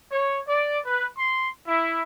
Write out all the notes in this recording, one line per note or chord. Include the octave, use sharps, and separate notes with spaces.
C#5
D5
B4
C6
E4